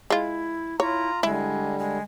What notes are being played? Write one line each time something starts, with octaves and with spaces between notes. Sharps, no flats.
G#3 E4 F4
E4 F4 C#5 A#5
D3 G3 G#3 E4
G#3